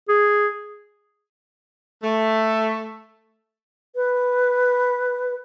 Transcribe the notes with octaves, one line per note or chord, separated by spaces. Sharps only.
G#4
A3
B4